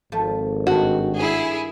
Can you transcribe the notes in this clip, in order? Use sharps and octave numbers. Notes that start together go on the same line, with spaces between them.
G#1 F3 A3
G2 D#3 F#4
E4 G#4